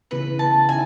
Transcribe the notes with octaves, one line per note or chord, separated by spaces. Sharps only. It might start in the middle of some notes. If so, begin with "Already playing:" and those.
C#3 E3 B3 B4
A5
D#3 C#4 E4 G#5